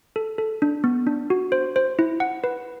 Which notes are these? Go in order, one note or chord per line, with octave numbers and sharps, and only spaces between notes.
A4
A4
D4
B3
D4
F#4
C5
C5
E4
F#5
B4